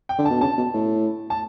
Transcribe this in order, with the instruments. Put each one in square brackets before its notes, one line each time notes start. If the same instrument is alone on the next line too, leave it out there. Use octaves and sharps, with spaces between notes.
[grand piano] G5
[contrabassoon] D3
[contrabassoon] B2 [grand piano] A5
[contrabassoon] C#3 [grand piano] A5
[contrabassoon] B2
A2
[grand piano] A5